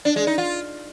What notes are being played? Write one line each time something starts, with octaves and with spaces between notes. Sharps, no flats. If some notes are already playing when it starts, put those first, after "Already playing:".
D4
G#3
D#4
F4